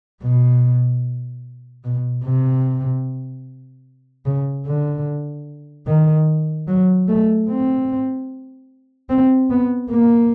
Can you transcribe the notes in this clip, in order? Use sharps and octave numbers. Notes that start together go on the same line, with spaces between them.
B2
B2
C3
C#3
D3
D#3
F#3
A3
C4
C4
B3
A#3